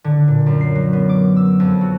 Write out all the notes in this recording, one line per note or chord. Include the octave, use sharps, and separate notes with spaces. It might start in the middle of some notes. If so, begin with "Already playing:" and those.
D3
A#2
F#2
C7
F#3
B3
D6
E6
F2
F#4